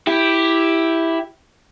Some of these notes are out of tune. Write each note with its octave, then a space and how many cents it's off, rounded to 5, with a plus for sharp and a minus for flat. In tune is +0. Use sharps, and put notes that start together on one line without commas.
E4 +0 G4 +0